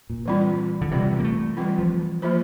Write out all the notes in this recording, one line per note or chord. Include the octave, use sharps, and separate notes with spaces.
A#2
E3 G3 C4 F4
D3
C3 E3 G3 C4 F4
A#3
A3
E3 G3 C4 F4
F3
F3 A#3 F4 C5